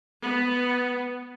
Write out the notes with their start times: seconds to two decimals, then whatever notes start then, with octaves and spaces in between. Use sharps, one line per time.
0.24 B3